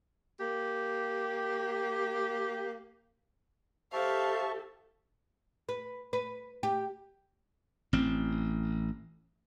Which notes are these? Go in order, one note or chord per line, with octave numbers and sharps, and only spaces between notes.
A#3 G4
G4 A4 C5 E5 F5 A5 C#6
B4
B4
G4
A1 C4